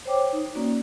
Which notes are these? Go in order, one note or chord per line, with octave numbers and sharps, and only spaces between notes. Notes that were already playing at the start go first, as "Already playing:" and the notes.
C5 C#5 G5 D6
D#4
A#3 C#4 F#4 D5